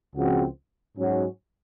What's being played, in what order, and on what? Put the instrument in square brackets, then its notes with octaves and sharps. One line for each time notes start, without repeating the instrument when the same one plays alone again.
[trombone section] C#2 C#3 F3 C4 F#4
G#2 F#3 C#4 F#4